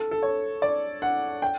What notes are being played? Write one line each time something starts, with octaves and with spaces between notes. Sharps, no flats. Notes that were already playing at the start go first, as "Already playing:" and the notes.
Already playing: A4
A4
C#5
D5
F#5
G5